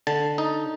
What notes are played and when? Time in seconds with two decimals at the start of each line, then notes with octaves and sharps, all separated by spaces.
0.07 D3 A5
0.38 D#4